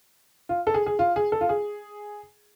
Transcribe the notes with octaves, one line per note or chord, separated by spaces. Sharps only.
F4
A4
G#4
G#4
F4
G#4
A4
F4
G#4